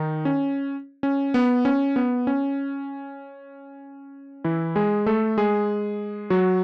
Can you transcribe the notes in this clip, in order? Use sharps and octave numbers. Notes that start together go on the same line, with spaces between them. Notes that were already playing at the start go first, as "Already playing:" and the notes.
Already playing: D#3 D#4
C#4
C#4
B3
C#4
B3
C#4
E3 E4
G#3 G#4
A3 A4
G#3 G#4
F#3 F#4